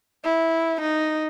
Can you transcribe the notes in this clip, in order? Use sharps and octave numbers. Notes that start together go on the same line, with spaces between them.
E4
D#4